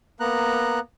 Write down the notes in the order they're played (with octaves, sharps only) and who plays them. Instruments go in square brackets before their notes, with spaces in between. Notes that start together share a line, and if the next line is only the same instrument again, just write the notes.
[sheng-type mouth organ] A#3 B3 A#5 F#6